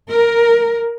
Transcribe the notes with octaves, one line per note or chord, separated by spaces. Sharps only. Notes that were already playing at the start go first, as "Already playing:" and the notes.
A#4